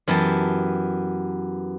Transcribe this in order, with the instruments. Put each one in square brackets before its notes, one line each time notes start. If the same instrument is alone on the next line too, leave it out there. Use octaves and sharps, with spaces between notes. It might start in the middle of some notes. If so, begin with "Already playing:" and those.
[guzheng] F#2 E3 B3 G4 A5